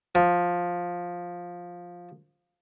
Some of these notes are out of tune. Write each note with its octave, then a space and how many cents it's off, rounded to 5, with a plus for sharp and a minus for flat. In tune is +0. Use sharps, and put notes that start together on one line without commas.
F3 +10